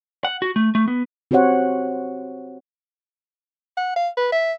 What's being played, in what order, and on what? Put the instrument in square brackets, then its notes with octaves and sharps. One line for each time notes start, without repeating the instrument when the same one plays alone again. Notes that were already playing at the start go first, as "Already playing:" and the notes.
[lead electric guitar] F#5
F#4
A3
A3
B3
[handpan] C4 F#4 G4 C5 C#5 F#5
[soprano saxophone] F#5
F5
B4
E5